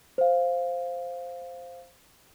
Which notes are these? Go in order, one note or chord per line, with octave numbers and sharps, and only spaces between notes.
C5 F5